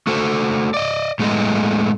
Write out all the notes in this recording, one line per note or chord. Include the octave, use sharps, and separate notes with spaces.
A3 F#4 A4 C5
D5 D#5
A2 G#3 A3 B3 D#5